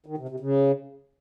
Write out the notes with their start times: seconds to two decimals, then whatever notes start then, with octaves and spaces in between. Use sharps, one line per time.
0.06 D#3
0.18 C3
0.29 C3
0.40 C#3